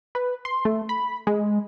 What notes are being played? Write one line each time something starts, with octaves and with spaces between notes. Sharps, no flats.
B4
C6
A3
B5
G#3